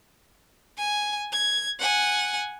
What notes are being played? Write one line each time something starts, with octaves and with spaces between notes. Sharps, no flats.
G#5
G#6
F#5 G#5